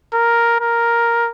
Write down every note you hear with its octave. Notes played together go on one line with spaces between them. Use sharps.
A#4
A#4